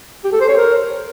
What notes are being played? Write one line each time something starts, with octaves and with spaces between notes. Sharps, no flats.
G4
A4
C5
C#5
A#4